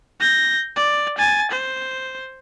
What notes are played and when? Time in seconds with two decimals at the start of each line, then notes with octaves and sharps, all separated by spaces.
0.20 G6 A#6
0.76 D5
1.18 G#5 A6
1.52 C5